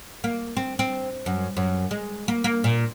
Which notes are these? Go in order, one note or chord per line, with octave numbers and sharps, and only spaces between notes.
A#3
C4
C4
F#2
F#2
G#3
A#3
A#3
A#2